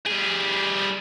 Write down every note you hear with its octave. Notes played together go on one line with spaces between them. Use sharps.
G3 G#4